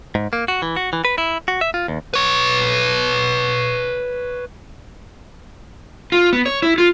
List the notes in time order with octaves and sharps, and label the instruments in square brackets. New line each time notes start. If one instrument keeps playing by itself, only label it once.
[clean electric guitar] G#2
A#3
F#4
E3
F#4
E3
B4
E4
F#4
E5
F4
D#2
[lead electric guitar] B4 C#5
[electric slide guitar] F4
B3
C#5
E4
F4